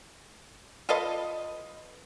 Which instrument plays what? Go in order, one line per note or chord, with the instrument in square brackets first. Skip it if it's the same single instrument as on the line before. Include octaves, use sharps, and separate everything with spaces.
[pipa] F4 A4 B4 D#5